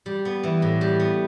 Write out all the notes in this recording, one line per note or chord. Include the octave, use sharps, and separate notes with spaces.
G3
B3
E3
A2
G3
B3